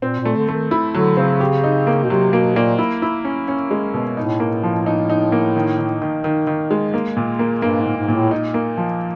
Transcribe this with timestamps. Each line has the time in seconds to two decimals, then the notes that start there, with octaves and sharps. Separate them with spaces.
0.02 A#2 C4
0.20 A#2
0.25 A3
0.37 D3
0.48 A3
0.54 D#3
0.71 E4
0.94 D3 F#3
1.17 C#3 C4
1.40 G4
1.64 D#4
1.87 A#3
2.04 B2
2.10 C3 F#3
2.33 B2 A#3
2.55 A#2 A#3
2.79 E4
3.02 E4
3.25 C#4
3.48 C#4
3.71 G#3
3.94 B2
4.17 A2 D#4
4.40 A#3
4.63 F3
4.86 D#4
5.10 D#4
5.32 A#3
5.56 D#3
5.79 D#3
6.02 D#3
6.24 D#3
6.47 D#3
6.71 G#3
6.94 A#3
7.17 A#2
7.39 A#3
7.62 G2 A#3
7.80 G#2
7.86 A#2
7.97 G#2
8.08 A#2
8.15 A2
8.31 D#4
8.54 A#3
8.78 F3